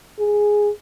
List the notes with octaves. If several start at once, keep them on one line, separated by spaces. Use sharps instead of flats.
G#4